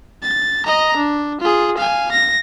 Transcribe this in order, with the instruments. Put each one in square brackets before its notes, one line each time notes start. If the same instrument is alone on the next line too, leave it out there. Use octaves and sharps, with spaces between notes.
[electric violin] A6
D#5 A#5
D4
F4 G#4
F5 G#5
A#6